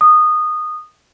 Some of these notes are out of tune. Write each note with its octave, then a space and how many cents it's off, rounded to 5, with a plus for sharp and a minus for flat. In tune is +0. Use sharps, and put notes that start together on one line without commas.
D#6 -15